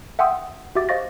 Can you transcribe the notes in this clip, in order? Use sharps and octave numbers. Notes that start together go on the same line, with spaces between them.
E5 F#5 G5 C6 D#6 E6
F#4 G4 E5 D6 A6
C5 D#5 F5 C#6 A6 A#6